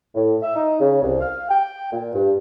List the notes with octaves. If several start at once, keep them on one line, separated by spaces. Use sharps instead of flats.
A2
E5
D#4
C#3
C2
F5
G5
A#2
G2